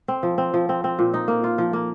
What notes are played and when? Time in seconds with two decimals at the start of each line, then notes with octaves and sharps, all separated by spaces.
0.08 C4
0.23 F3
0.38 C4
0.54 F3
0.69 C4
0.84 C4
0.99 A#2
1.14 D#4
1.28 A#3
1.44 F4
1.58 F3
1.73 A#3